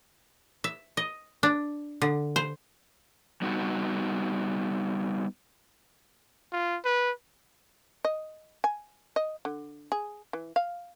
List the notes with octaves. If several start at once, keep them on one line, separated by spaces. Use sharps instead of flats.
E5
D#5
D4
D3
C5
G3 B3 D#4 F#4
F4
B4
D#5
G#5
D#5
D3
G#4
E3
F5